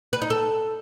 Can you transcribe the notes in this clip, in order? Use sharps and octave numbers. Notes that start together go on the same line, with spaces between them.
B4
D#4
A4